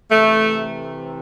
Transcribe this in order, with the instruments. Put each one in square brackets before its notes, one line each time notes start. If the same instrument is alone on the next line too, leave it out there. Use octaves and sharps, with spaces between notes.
[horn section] C3 E3 A3